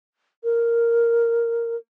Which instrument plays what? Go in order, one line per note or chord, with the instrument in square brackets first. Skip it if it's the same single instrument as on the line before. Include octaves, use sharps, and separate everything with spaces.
[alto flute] A#4